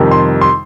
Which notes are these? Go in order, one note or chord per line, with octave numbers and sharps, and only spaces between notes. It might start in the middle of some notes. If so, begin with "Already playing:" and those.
Already playing: F2 C3 D#3 G3
C6
C6